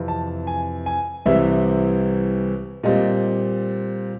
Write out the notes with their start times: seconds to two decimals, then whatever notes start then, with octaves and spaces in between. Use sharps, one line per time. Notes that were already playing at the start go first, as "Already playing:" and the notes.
Already playing: F2 C3 E3
0.08 A5
0.47 G#5
0.86 G#5
1.26 C2 C3 E3 G3 C4 E5
2.83 A#2 G3 C4 D#5